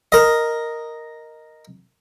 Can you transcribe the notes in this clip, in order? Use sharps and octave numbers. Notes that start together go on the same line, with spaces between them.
A#4 D#5